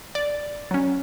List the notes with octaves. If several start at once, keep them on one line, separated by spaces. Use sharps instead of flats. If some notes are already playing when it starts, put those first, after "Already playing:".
D5
F#3 C#4